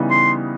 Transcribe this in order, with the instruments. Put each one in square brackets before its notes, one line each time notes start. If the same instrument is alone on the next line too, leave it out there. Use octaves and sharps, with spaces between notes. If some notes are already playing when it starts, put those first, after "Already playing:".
Already playing: [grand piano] C#3 E3 G3 B3 D#4
[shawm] C6